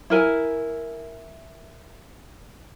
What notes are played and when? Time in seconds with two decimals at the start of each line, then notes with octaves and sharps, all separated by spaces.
0.10 E4 A#4 G#5